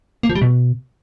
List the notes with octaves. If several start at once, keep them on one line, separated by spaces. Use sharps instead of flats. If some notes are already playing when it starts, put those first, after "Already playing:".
A#3
F3
G3
B2